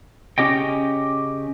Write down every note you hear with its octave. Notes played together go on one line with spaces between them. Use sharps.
C#3 C#4 G4 D#5 G5